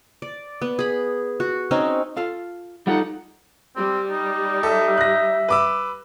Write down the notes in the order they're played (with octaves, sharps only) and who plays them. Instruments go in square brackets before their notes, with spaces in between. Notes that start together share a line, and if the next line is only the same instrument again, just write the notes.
[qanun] D5
B3
G#4 B5
F#4
C4 C#4 D#4
[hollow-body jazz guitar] F4 A4 F5
[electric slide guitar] G3 F4 A4 [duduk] D#4 [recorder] F#5
[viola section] G3 [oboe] C4
[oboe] D#4
[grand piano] A4 [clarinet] E5
[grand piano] F#6 A#6
B4 D6 E6